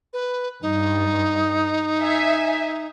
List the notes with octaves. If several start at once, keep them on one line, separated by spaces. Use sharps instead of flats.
B4
G2 D#4
E5 G#5